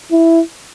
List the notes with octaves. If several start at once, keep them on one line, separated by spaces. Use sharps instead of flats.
E4